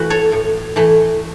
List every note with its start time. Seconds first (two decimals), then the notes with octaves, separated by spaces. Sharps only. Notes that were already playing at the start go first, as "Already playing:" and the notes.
Already playing: E3 A3 E4 F#4 B4
0.10 A4 C#5
0.32 A2
0.76 E3 A3